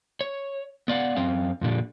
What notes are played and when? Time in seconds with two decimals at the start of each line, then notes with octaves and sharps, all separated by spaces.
0.21 C#5
0.88 B3 D5 F5 F#5
1.16 F#2 C4 F5
1.61 F2 A#2 D3 G3